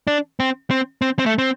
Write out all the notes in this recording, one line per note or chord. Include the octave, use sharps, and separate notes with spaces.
D4
C4
C4
C4
C4
A3
C4